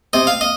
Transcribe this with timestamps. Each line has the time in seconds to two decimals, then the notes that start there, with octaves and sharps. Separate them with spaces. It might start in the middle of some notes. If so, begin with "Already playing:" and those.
0.13 C3 D#5
0.27 F5
0.41 D#5